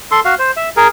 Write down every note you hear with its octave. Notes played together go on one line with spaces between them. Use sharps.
A4 C6
F#4 F5
C5
E5
G#4 A#4